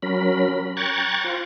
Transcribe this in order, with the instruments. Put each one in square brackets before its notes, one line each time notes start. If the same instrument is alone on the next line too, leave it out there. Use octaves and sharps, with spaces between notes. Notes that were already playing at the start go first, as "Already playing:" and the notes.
[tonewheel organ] F#3 C#4 A#4 B5
G5 A#5 C#6 F#6 G#6 A6
F4 C5